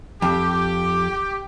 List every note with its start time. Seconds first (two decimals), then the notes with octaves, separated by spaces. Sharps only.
0.22 F2 G4